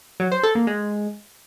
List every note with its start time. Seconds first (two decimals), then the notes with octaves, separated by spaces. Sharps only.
0.20 F#3
0.32 C5
0.43 A4
0.55 A#3
0.67 G#3